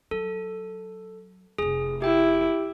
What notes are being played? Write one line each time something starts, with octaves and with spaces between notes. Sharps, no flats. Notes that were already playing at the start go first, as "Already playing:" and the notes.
F#3 A4
F1 C3 G#4
E4 G4 G5